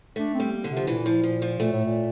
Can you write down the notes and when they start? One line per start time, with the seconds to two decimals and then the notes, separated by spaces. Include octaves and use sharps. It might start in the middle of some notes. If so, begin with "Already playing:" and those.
0.16 A3 D4
0.34 C4
0.40 G3
0.52 A#3
0.64 D3
0.70 C3
0.77 F3
0.87 A#2 E3
1.06 F3
1.23 F3
1.42 F3
1.59 A#2 A3
1.72 A2
1.85 A#2